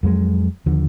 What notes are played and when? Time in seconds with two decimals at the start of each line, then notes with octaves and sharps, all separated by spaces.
0.03 F2 F#3 G#3
0.66 D#2 D3 F3